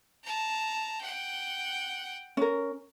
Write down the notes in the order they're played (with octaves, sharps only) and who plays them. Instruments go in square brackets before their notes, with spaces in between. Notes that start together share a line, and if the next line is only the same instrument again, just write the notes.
[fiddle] A5 A#5
F#5 G5
[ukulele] C#4 A#4